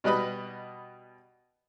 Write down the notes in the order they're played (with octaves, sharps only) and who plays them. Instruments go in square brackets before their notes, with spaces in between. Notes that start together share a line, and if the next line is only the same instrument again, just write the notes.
[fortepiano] B2 G3 B4 D#5 B5